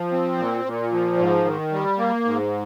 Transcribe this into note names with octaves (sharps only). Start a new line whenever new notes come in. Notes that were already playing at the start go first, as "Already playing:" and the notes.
Already playing: F3
C4
A#2
A#2
F3
G#2
D#3
G3
A#3
G#2